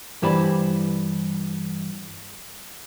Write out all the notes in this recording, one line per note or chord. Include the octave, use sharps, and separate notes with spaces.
G2 E3 G4 C5 D5 B5